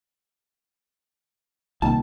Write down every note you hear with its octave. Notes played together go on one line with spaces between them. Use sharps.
C2 A#2 D#3 A5